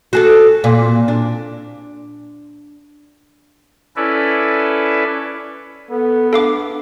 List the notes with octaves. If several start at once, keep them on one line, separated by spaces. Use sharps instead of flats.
F#4 G#4 A4
A#2
D4
C#4 E4 A4 B4 D5 E5
B3 A4
D4 A4 F5 D6